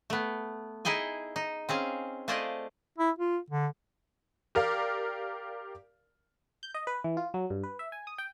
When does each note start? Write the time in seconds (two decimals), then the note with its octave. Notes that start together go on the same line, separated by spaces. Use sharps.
0.10 A3 B3
0.85 D#4 E4 G#4 G5 G#5
1.36 D#4
1.69 C4 C#4 G#4 F5
2.28 A3 F4 G#4 C5 D5 D#5
2.98 E4
3.19 F4
3.50 D3
4.55 G4 A#4 D5 F5
6.63 G6
6.74 D#5
6.87 B4
7.04 E3
7.17 F4
7.34 F#3
7.50 G2
7.63 B4
7.79 E5
7.92 G#5
8.07 D#6
8.18 G5